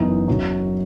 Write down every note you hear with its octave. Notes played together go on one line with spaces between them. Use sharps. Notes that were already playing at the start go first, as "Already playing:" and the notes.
Already playing: F#1 F#2 E3 B3 D#4
F#1 F#2 F#3